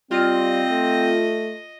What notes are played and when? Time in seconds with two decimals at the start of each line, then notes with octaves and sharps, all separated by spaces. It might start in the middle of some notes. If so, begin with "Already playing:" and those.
0.11 G3 C4 F4 D#5
0.70 A3